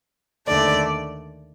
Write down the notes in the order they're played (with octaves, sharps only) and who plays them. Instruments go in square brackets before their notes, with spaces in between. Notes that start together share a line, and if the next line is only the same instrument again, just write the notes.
[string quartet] D#2 D3 A3 D5